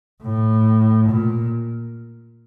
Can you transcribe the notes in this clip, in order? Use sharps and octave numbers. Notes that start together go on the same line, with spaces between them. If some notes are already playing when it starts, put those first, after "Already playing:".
A2
A#2